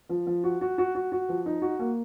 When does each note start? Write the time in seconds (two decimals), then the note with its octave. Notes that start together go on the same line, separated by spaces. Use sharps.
0.09 F3
0.26 F3
0.44 F#4
0.61 F#4
0.78 F#4
0.95 F#4
1.12 F#4
1.29 F3
1.46 D#4
1.62 F#4
1.79 A#3